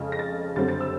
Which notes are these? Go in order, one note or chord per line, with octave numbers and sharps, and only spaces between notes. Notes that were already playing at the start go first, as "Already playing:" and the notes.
Already playing: F2 C#3 F3 G#3
A#6
A6
F#2 D3 G3 C4 A6
A6
E6